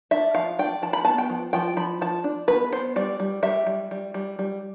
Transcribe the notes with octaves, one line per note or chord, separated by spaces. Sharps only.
D4 E5
F3 F5
D4 G5
F3 A5
B5
B3 A5
G5
F3
F3 G5
F3 B5
F3 A5
D4
B3 B4
B3 C5
G3 D5
G3
G3 E5
G3
G3
G3
G3